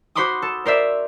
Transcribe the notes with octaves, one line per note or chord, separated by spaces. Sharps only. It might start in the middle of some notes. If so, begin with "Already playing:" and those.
F#4 C5 B5 C6 D6 D#6
A4
A#4 C5 D5 E5